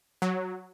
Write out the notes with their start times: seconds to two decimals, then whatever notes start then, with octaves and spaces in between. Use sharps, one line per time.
0.22 F#3